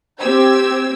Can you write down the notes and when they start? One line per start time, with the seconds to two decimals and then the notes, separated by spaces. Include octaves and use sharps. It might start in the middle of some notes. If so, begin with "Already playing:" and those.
0.19 C4 G4 C5 E6 G#6